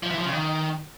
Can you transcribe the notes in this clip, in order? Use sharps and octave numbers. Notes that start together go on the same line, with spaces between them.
F3
E3
F3
C#3
D#3